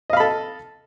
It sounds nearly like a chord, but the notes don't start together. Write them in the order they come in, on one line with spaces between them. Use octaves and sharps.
D#5 F5 B5 A4